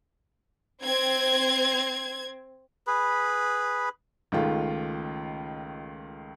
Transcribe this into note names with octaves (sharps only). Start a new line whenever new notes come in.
C4 G#6
G#4 B4 B5
C#2 D#3 A3 F4